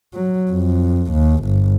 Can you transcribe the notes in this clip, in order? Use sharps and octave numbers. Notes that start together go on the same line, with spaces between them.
F#3
F2
D#2
G1